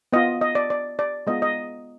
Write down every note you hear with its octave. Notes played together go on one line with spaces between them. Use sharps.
B3 F4 D#5
D#5
D5
D5
D5
G#3 B3 F4 D#5
D#5